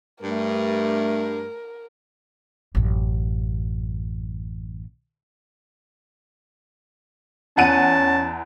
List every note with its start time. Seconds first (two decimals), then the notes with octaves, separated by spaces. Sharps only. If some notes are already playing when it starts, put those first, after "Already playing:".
0.23 G2 A3 A#4
2.75 A1 F#2
7.57 E2 C#4 F#5 A5 D#7